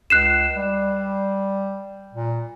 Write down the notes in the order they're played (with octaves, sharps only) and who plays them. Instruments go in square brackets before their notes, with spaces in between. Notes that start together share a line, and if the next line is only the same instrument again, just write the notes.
[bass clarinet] C#2 [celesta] F#6 C7 E7
[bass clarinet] G3
A#2